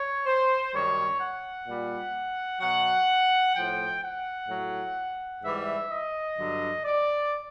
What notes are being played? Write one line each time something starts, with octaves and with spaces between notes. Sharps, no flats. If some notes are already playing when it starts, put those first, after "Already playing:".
Already playing: C#5
C5
F#2 D#3 G3 C#5
F#5
A#2 G3
B2 F#3 F#5
A2 F3 G5
F#5
A2 F#3
G#2 E3 G3 E5
D#5
G2 D3 F#3
D5